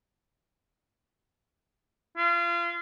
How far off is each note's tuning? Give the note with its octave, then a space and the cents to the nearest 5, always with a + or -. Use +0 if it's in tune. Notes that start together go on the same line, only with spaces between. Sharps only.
F4 -30